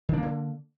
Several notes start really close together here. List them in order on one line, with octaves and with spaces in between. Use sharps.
D#3 D4 A#3 D3